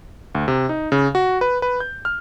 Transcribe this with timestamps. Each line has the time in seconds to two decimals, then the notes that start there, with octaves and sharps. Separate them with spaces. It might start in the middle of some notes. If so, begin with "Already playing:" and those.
0.35 D2
0.48 C3
0.69 D#4
0.92 C#3
1.15 F#4
1.41 B4
1.62 B4
1.80 G6
2.05 F6